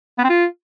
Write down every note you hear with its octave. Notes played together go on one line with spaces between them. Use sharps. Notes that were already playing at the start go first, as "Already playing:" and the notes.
B3
C4
F4